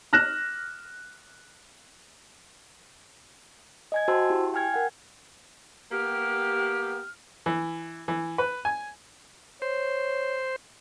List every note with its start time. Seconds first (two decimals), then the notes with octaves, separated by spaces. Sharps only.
0.13 F6 F#6 A#6 E7
3.92 D#5 G#5 G#6
4.08 F#4 C5 G5 A5 C6 E6
4.30 E4 G4
4.54 G5 G#5 F6 G#6
4.74 A#4 F#5
5.92 A#3 B3 G4 F6
7.46 E3
8.08 E3
8.38 B4
8.65 G#5
9.62 C5 C#5